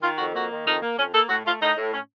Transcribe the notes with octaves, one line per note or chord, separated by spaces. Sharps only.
D#3 F4
F2 F#4
A#3 F#4
D#3
F2 D#4
A#3
F2 C#4
A#3 A4
A2 F#4
A3 F4
A2 D#4
A2
C#4